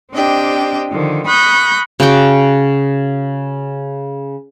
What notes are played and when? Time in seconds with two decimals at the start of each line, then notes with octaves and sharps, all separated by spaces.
0.12 C4 D4 G4 D#5 G5
0.90 D3 D#3 F3
1.26 B5 C#6 D#6 F#6 G6 A#6
2.00 C#3 F#4 G5 D6